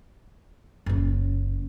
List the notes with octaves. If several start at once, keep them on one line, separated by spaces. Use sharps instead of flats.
F#1 C#4